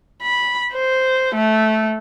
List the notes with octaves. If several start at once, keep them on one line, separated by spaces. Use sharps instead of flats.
B5
C5
A3